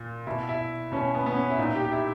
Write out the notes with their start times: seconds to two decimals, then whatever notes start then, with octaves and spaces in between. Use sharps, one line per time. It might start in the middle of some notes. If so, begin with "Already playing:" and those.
Already playing: A#2
0.27 B2 E4
0.49 E4
0.92 B2 C#4
1.15 B3
1.26 B3
1.36 C#4
1.50 E4
1.58 A#2 D#4
1.74 G4
1.85 G4
1.92 E4